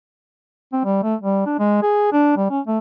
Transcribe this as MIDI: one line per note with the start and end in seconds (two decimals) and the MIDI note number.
0.73 0.80 60
0.85 1.03 55
1.03 1.15 57
1.21 1.41 55
1.46 1.56 62
1.59 1.80 56
1.82 2.09 68
2.12 2.33 62
2.37 2.46 55
2.50 2.60 61
2.67 2.79 57